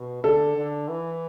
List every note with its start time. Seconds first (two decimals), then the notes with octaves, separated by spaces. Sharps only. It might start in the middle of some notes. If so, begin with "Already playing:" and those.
Already playing: B2
0.24 D3 A4
0.56 D3
0.88 E3